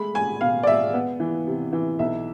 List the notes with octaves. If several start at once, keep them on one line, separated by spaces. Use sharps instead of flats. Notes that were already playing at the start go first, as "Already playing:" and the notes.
Already playing: G#3 A3 B5
G#3 G#5
B2 F5
D5
G#3 E5
B3
E3
C3
E3
B1 E5